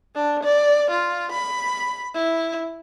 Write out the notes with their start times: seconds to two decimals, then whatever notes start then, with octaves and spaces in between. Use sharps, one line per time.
0.15 D4
0.44 D5
0.91 F4
1.32 B5
2.15 E4